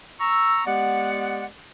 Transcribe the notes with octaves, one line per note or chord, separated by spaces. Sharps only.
A#5 C#6 E6
G#3 B3 G4 D5 F#5